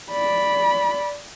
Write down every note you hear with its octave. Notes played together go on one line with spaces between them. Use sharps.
D5 B5